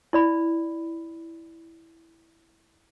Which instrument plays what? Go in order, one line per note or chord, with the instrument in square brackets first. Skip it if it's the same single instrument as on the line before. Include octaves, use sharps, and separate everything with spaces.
[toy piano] E4 D5 B5